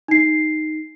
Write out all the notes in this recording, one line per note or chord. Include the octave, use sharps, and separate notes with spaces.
D#4 C7